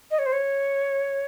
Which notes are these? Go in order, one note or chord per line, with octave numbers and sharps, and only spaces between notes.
D#5
C#5
C5
C#5